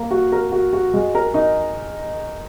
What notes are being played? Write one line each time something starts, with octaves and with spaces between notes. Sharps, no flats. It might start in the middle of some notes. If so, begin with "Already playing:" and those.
Already playing: A#3 A#4
F#4
A#4
F#4
F#4
G#3
A#4
D#4